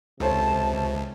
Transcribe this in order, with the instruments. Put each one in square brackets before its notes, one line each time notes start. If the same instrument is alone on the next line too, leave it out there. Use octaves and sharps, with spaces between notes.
[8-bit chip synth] C#2 [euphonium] C3 [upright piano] A4 C5 C#5 [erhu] A5